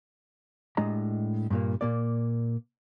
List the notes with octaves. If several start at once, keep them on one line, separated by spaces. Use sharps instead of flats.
A2 G#3 D4 G4 D#5 A#5
G2 A#2 A#3
A#2 A#3 D5